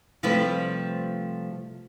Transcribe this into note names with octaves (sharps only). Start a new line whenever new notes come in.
C3 F3 G3 A3 F4 B4